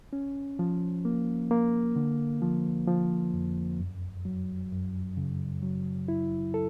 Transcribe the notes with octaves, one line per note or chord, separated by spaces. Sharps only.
C#4
F3
A#3
A#3
D3
F3
F3
F2
F#2
F#3
F#2
C#3
F#3
E4
A4